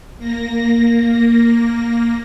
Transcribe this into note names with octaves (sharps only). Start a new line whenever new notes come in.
A#3 A#6